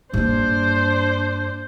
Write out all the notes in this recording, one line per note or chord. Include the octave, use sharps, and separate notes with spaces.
G2 A#3 D4 C5